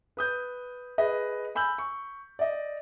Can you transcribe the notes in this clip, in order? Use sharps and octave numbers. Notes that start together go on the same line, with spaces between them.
B4 D#6 G6
G#4 B4 D#5
G#5 B5 E6 G6 F#7
C#6
D5 D#5